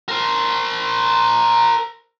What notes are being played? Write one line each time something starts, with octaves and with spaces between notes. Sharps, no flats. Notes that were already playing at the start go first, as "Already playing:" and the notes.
A#4 C5